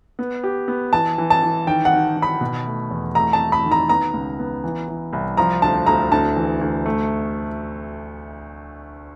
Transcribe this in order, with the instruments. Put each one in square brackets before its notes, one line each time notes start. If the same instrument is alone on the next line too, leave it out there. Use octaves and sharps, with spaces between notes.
[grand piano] B3
G4
B3
[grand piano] E3 [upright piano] A5
[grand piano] E3
[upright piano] A5
[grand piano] E3
[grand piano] D#3 [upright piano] G5
[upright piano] F#5
[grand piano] D#3
D#3
[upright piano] B5
[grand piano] B2
A3
E2
[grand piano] A3 [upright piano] A#5
[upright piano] A5
[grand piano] A3
[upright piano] B5
[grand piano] D#3
[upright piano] A#5
[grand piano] B3 [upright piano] A#5
[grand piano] C#2
B3
E3
E3
C2
[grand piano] F3 [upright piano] A#5
[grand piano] D2 [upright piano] A5
[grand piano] D2 [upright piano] A#5
[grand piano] D2 [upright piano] A5
[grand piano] E3
D2
A3